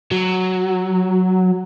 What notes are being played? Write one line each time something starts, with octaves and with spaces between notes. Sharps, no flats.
F#3